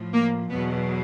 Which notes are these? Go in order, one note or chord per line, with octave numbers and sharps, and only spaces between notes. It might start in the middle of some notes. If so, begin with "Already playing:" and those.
Already playing: A2 F3
A#3
E2 B2 F#3 B3